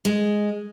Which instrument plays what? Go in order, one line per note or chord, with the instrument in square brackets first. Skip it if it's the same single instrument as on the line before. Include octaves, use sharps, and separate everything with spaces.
[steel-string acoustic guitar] G#3